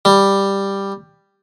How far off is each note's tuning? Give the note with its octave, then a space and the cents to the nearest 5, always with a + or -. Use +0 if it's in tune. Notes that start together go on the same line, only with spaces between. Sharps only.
G3 +5